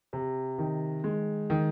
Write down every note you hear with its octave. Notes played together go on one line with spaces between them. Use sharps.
C3
D#3
G#3
D#3